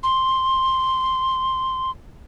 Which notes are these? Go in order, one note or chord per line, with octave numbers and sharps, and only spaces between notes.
C6